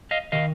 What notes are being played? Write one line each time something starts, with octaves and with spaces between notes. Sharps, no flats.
D#5 F5
C3 D#3 D#5 F5